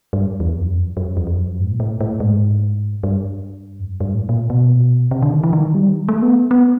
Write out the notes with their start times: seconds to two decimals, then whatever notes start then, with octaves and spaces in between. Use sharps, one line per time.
0.13 G2
0.40 E2
0.54 F2
0.63 F#2
0.70 F2
0.97 F#2
1.17 F2
1.27 F2
1.38 F#2
1.59 G#2
1.71 A#2
1.80 A2
2.01 A2
2.20 G#2
3.03 G2
3.80 F2
3.87 F#2
4.00 G2
4.14 A2
4.29 A#2
4.50 B2
5.11 C3
5.23 D3
5.32 D#3
5.44 E3
5.53 D#3
5.75 G3
6.09 A3
6.22 B3
6.51 B3